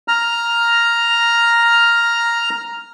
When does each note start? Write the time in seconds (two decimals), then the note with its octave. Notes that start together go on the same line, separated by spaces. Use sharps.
0.08 A#5 F6